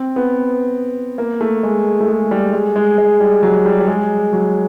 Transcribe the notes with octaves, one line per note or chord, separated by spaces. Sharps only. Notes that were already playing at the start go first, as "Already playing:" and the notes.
Already playing: C4
B3
A#3
A3
G#3
A3
G#3
G3
G#3
G#3
G#3
G3
F#3
G3
G3
G#3
F#3